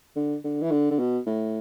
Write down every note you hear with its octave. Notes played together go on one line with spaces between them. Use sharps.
D3
D3
E3
D3
D3
B2
A2